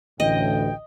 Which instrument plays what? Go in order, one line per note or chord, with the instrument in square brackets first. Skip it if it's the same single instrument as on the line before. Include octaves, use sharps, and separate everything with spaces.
[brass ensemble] A1 D2 A2 [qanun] D#5 [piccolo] G5